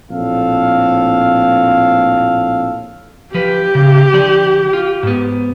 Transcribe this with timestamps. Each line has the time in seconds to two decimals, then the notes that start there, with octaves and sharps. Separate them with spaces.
0.10 A#1 A2 C4 A4 F5
3.34 F3 G4 B4
3.75 C#3
4.13 D3 F3 D5
4.73 F4
5.03 G#2 B3